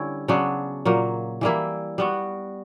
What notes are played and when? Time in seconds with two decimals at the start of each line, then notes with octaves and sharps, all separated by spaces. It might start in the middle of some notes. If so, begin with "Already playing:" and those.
Already playing: D3 G3 C#4 E4
0.28 C#3 F#3 B3 D4
0.85 A#2 F#3 A#3
1.41 E3 G3 A#3 E4
1.98 G3 B3 F#4